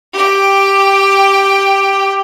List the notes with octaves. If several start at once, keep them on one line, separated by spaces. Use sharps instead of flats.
G4 G5